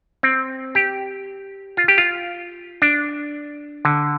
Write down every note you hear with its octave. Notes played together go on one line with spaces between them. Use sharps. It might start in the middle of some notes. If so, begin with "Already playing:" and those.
C4
G4
F4
G4
F4
D4
D3